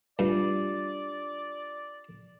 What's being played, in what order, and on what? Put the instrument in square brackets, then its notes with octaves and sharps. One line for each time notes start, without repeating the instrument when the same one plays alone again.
[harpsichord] G2 [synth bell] D4 F4 G4 [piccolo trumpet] D5